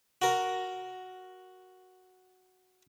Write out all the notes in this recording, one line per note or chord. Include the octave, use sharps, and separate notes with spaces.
F#4 A#4